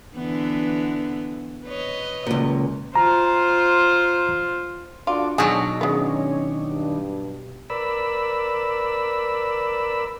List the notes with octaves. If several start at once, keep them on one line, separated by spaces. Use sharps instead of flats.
D3 E3 B3
B4 C#5 D#5
C#2 A#2
F4 C5 A#5
D4 F4 F#4 A4 D5 D6
B2 D3 F#3 D4 D#4 G#4
D#3 G#3 B3 C#4 D4 C#5
G2
A#4 B4 D5 B5 E6